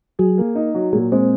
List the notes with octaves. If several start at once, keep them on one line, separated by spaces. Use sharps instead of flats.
F#3 G#4
A#3
D#4
F#3
A#2 G#3
G#3 C4